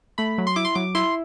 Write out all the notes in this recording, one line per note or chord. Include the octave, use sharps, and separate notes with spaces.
A3 B5
F#3
C6
E4 D6
C6
F#3 D6
E4 C6